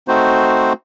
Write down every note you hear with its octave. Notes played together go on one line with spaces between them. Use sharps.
A3 C4 D#4 F#4 C5